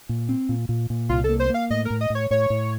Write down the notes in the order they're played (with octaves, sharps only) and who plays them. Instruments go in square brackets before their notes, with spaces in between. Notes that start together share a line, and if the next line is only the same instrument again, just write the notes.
[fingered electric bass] A#2
C4
A#2
A#2
A#2
[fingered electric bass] C2 [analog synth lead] F4
[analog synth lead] A4
[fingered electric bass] A#3
[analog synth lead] C5
[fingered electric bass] A#3 [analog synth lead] F5
[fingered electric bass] A2 [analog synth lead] D#5
[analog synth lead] A#4
[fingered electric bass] A2
[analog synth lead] D#5
[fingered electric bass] A2 [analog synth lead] C#5
[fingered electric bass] A2 [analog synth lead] C#5
[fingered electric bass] A2